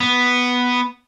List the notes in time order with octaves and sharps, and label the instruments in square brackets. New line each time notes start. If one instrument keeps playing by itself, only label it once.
[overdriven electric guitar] B3